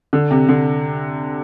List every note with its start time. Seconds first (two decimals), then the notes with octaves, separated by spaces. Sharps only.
0.13 D3
0.31 C3
0.49 D3